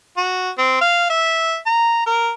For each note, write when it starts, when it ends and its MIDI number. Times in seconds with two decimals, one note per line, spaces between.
0.17 0.50 66
0.58 0.77 60
0.81 1.09 77
1.10 1.56 76
1.66 2.06 82
2.06 2.31 70